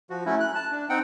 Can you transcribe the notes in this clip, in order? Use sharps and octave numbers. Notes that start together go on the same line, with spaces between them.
F3 F#4
F#3 A3 C#4 E4
F#6
A5
D4
C4 D#4 F#5 G5